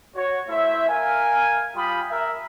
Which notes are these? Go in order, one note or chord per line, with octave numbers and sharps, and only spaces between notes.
F#4 C#5
A3 E4 C5 E5
A#4 F5 G#5
G3 F4 G5 B5 D#6
A#4 E5